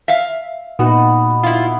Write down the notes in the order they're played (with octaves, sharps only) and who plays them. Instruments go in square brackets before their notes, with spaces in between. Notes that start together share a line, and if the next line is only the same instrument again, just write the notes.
[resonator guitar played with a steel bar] E5 F5
[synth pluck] A#2 D#4 F#4 [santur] B3
[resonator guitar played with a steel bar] E4 F4